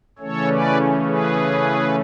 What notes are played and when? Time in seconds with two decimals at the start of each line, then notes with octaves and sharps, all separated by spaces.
0.19 C#3 E3 A3 C#4 A4 C#5
0.48 B4 D5
1.05 G#4 B4